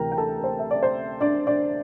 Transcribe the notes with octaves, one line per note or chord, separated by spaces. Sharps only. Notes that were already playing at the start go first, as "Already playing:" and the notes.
Already playing: D2 C3 E3 A#4 G5 A#5
G5
A4 A5
A#4
C5
E5
D5
C5
D4 D5
D4 D5